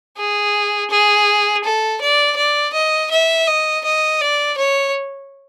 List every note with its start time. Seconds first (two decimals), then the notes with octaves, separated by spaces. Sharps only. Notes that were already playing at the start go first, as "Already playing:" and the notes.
0.17 G#4
0.90 G#4
1.64 A4
2.01 D5
2.37 D5
2.73 D#5
3.11 E5
3.47 D#5
3.84 D#5
4.21 D5
4.58 C#5